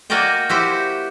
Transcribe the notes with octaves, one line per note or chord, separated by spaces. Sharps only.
A#3 F#4 A#4 D5 D#5 G5
E4 F#4 G4 C5